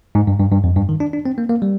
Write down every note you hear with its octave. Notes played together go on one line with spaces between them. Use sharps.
G#2
G2
G2
G2
F2
G2
D#3
D4
D4
C4
A#3
A#3
G3